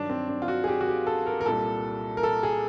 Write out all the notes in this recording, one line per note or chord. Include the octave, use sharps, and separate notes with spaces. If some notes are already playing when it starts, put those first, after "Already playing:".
Already playing: G2 D#3 F#3 D4
C4
D4
F4
F#4
G#4
G4
F#4
G4
A4
A#4
A#4
C2 A#2 G3 A4
A#4
A4
G#4